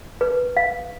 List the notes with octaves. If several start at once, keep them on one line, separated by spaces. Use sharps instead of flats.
B4
F5